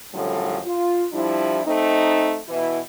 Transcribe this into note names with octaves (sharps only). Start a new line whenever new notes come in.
F#2 A2 D3 F3 G3
F4
F3 G3 D4 E4
A3 C4 D#4
B2 E3 E4